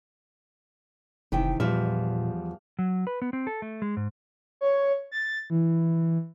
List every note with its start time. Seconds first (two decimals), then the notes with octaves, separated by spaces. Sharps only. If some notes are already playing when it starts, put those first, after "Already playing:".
1.32 F1 C3 D#3 E3 G5
1.60 E2 A#2 F3 G3 E5 F6
2.79 F#3
3.07 B4
3.22 B3
3.33 C4
3.47 A4
3.62 A3
3.82 G#3
3.97 G#2
4.61 C#5
5.12 A6
5.50 E3